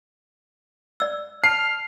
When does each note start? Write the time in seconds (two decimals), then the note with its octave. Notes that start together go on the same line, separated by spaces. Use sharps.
1.00 D5 E6
1.44 A5 F6 C7